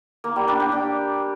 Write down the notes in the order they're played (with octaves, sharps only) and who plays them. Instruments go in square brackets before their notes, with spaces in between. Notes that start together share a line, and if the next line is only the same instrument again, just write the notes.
[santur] A#3
G3
D4
G4
D4